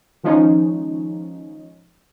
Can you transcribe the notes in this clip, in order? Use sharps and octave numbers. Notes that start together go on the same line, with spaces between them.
D#3 F3 G#3 C#4 D#4